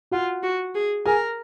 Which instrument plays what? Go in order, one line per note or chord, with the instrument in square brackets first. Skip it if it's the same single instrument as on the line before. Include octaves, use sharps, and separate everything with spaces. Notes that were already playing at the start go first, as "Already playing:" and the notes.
[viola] F4 [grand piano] F#4 F#5
[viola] F#4
G#4
[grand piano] G#4 G#5 [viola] A#4